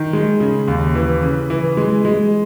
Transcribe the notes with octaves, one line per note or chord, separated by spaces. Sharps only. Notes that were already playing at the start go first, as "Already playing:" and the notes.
Already playing: D#3
G#3
C#3
D#2
E3
C#3
E3
G#3
G#3